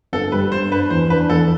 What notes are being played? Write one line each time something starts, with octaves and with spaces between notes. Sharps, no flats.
G1 A4
G3 B4
G2 C5
D4 B4
E2 C5
D4 B4
E2 A4